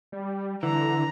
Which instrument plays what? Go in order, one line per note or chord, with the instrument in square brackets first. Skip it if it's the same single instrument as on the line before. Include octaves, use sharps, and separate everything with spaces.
[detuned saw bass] G3
[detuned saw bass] D3 [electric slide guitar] E3 [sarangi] A#5